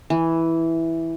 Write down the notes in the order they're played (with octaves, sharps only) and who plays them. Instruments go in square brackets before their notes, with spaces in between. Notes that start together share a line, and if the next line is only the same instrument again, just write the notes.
[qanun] E3